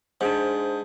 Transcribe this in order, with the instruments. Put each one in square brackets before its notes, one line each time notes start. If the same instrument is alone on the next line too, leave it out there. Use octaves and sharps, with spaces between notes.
[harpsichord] G#2 [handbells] D4 G#4 C5